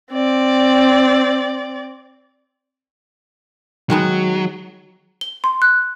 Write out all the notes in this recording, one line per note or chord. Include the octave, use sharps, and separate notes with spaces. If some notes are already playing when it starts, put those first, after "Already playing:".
C4 D5
D#3 F#3 G#3 B3
G7
C6
F#6